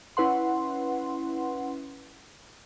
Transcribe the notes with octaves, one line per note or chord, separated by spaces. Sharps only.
C#4 E4 B4 F#5 C6